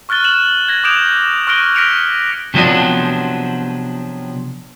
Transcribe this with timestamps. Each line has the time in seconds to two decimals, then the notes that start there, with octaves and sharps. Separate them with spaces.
0.09 C#6 F6 F#6 A6 G7
0.24 E7 F#7
0.69 G#6 A#6
0.84 D6 D#6 G6 D7 E7 F7
1.47 C#6 F6 F#6 A#6 D7 G7
1.75 F6 A#6 B6 C#7 D7 F7
2.54 C3 F3 F#3 B3 D4